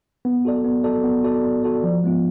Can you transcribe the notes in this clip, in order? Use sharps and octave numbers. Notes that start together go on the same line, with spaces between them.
B3
F#4 A4 D5
B3
F#4 A4 D5
B3
F#4 A4 D5
B3
F#4 A4 D5
F3
G#3 B3 F4